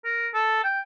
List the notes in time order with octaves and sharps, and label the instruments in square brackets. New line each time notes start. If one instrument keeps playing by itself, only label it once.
[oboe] A#4
A4
G5